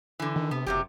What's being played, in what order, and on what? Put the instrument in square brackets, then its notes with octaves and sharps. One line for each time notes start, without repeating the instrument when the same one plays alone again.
[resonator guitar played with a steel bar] D3 E3
[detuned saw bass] D#3
[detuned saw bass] C3 [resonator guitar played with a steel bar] B3
[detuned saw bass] F#1 [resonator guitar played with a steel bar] C3 F#3 G4